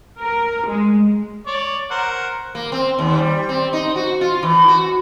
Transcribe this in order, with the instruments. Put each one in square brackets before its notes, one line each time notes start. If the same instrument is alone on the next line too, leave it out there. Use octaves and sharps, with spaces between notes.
[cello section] A#4
G#3
[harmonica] C#5 D5
A#4 C5 F#5
[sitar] A#3
C4
D#2
G3
C4
D#4
F#4
F4
E3
F#4